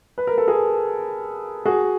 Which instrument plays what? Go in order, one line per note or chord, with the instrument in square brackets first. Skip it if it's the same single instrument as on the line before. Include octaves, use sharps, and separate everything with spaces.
[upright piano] B4
A#4
A4
G#4 A#4
F#4 G#4